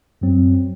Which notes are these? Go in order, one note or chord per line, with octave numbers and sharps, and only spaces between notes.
F#2 F#3 C4